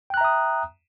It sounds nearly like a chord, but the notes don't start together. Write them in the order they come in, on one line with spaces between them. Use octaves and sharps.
G5 F#6 A#5 E5 D#6